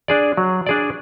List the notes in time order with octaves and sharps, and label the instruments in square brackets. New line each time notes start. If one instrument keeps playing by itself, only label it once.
[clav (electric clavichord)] D4 G#4 D5
F#3
D4 G#4 D5